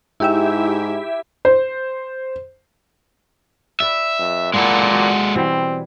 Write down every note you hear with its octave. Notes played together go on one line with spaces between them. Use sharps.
G#2 E4 G4 E5
C5
B4 D5 E5
F2
A#2 G#3 A#3 B3 E4 A4
F#4 D5
B2 E3 G3 C4